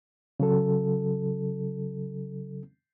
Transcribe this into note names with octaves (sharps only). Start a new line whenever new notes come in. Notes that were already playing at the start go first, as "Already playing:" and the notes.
C#3 F#3 A4